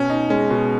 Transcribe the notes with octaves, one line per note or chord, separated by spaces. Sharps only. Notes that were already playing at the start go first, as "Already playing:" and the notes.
Already playing: B2 C#4
D#4
G#3 C#4
B2